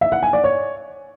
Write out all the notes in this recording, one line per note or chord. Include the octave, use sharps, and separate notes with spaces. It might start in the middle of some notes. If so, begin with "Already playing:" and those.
E5
F#5
G#5
D5
C#5